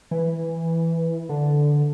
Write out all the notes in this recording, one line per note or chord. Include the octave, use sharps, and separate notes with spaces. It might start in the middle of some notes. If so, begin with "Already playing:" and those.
E3
D3